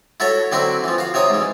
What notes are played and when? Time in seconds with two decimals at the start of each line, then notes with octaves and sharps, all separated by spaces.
0.20 E4 F#4 A4 C#5
0.52 D3 F#3 C4 E4 F#4
0.84 E3 F3
0.98 F#4 F5
1.14 C3 D#4 C#5
1.30 G#2 E3